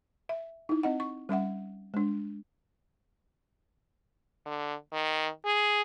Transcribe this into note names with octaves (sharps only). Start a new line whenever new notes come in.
E5
D#4 E4
C4 D#5 F#5
C#6
G3 C#4 E5 F#5
G#3 D4
D3
D#3
G#4